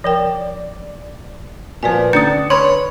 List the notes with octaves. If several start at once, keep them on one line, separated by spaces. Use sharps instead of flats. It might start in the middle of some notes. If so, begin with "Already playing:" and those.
F3 A#4 D5 G5
A#2 F3 B4 D5 G#5
D3 A3 C#4 D4 D#6 A6 C#7
B4 C#5 B5 C6